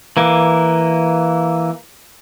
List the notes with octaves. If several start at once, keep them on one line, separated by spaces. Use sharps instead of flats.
E3 A#3